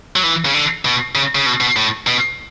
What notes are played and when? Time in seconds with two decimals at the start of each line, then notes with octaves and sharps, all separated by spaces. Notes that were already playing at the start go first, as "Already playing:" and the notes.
0.16 F#3
0.23 E3
0.45 C#3
0.54 D3
0.85 B2
1.15 C#3
1.35 C#3
1.46 B2
1.61 B2
1.77 A2
2.07 B2